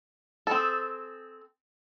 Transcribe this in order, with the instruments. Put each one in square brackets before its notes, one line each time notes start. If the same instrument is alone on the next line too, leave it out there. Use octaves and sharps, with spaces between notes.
[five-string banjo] C4 G#4 A4